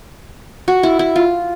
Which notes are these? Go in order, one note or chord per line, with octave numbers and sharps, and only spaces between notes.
F#4
E4
E4
F4